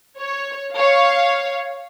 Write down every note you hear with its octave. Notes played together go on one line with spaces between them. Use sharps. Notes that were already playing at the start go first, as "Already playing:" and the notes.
C#5
C#5 F5